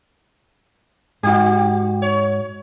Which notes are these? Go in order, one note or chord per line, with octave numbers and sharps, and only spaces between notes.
G#2 D#4 F#4 G4
C#5